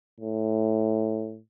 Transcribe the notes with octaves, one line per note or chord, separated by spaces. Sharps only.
A2